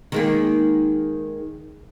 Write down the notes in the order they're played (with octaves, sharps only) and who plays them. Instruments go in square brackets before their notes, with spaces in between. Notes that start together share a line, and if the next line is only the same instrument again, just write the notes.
[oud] D#3 G#3 A#3